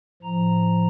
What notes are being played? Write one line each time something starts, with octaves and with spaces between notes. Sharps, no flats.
A2 F3 A#5